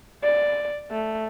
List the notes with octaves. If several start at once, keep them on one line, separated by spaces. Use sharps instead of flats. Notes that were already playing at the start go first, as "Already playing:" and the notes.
D5
A3